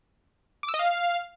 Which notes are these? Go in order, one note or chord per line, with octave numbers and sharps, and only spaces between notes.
D6
E6
D#5
F5